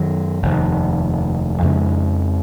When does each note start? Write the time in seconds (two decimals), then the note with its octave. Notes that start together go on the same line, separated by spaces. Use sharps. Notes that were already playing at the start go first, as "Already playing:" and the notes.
Already playing: F#2 D#3 F#3
0.42 F1 D#2 D#3
1.62 F2 C#3 G#3 C#4